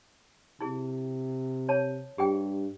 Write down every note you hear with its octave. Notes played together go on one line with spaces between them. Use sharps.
C3 E4 G#4
C#5 A5
G2 G4 G#4 G5